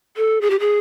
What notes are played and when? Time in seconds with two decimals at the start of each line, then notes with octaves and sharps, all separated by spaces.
0.17 A4
0.41 G#4
0.50 G4
0.60 G#4